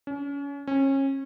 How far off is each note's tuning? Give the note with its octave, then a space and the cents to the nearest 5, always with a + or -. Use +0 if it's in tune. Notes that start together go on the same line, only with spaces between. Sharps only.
C#4 +30
C#4 -30